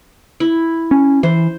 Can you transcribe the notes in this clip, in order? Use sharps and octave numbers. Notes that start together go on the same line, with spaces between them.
E4
C#4
E3 C5